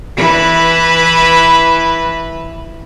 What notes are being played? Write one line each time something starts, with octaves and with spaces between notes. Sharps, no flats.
E3 B4